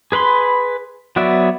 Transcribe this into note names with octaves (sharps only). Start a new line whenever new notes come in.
G#4 B4 B5 C6
F#3 B3 F#4 D5 E5